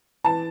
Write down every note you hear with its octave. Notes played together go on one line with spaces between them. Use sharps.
E3 A5